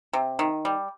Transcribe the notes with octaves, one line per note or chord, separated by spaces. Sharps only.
C3
D#3
G3